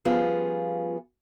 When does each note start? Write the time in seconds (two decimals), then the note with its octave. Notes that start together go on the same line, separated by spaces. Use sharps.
0.05 F3 G3 B3 C#4 F4 G#4